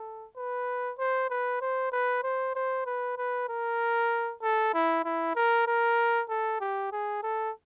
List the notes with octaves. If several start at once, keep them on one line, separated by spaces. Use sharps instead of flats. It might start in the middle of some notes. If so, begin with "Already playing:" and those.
Already playing: A4
B4
C5
B4
C5
B4
C5
C5
B4
B4
A#4
A4
E4
E4
A#4
A#4
A4
G4
G#4
A4